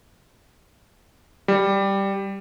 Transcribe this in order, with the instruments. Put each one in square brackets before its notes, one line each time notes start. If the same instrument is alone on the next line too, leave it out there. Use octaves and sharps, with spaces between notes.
[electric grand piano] G3